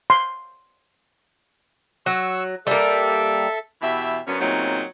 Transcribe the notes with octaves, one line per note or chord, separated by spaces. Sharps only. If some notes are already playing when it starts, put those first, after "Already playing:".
C6
F#3 C#6 E6
G3 A#3 A4 E5
B2 E3 G4 E5
F#2 D3 B3 C#4
A#2 C#3 F#3 A3 C4 D#4